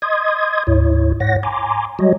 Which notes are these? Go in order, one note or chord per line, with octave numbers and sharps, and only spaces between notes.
D#5 C6 D#6 G#6
D2 G#2 E4 C#5
G#2 C#5 F#5 A#6
G#5 A#5 C6 D6
F#3 G3 F#4 C#5 D#5